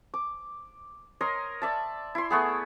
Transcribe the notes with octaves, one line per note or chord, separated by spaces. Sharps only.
D6
A#4 C#5 D#5 C6
D5 E5 A5
E4 C6
A3 B3 G#4